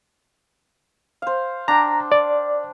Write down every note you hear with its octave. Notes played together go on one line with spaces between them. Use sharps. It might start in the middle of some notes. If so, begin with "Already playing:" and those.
C5 F5
D4 G5 A#5
D5